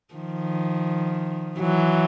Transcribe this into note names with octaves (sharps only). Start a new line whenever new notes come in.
D#3 F3
E3 F#3